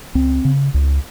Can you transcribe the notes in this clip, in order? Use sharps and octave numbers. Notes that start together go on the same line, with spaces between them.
C#2 C4
C#3
C#2